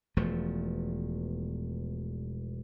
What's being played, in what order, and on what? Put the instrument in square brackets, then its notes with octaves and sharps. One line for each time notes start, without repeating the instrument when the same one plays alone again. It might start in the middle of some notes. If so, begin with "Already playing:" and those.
[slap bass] E1 E2 F3 A3